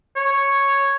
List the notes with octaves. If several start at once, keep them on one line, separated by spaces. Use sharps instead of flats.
C#5